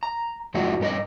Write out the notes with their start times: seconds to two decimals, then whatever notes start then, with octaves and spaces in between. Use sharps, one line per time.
0.03 A#5
0.54 F2 F3 F#3 A3 E4 F#4
0.80 G2 C#4 A#4 D#5